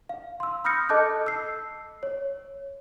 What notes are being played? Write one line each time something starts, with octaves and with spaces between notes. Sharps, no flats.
F5
C6 E6
B5 D#6 F6 G6 A#6 C#7
A4 D#5 A5 D6 F#6 G6
E6 C7
C#5